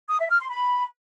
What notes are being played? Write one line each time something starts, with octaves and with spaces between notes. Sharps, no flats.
D#6
E5
F6
C6
B5